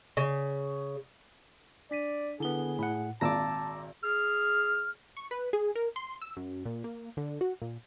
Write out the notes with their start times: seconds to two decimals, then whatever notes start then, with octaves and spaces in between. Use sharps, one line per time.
0.17 C#3
1.91 D4 D5 B6 D#7
2.40 D3 B3 E4 G#4 G7
2.79 A2 F#5 B5
3.21 G#1 A#2 D5 A5 A#5 D6 E6 A#6
4.03 G#4 F6
5.17 C#6
5.31 B4
5.53 G#4
5.75 A#4
5.96 C6
6.22 E6
6.37 F#2
6.65 A#2
6.84 A#3
7.17 D3
7.41 F#4
7.62 A#2